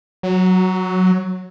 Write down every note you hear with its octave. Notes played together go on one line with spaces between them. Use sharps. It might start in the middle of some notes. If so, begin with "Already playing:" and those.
F#3